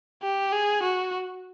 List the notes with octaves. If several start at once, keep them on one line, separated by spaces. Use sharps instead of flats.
G4
G#4
F#4